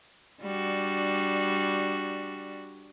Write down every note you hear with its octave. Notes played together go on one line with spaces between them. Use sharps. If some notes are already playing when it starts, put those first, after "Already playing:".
G3 D4 F#4